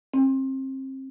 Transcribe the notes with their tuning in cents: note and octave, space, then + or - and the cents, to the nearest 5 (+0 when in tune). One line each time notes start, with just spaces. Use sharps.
C4 +30